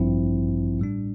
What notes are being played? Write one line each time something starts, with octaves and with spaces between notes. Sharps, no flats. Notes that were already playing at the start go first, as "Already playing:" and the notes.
Already playing: A1 G2 F3 C4 E4
A2 G3 D4